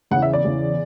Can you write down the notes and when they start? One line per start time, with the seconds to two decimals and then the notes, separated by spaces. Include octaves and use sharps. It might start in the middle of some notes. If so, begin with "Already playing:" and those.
0.11 E2 C#3 E3 F#5
0.22 E5
0.33 D5
0.45 E2 C#3 E3